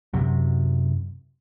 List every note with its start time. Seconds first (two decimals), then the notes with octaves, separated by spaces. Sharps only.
0.13 F#2 C3 F#3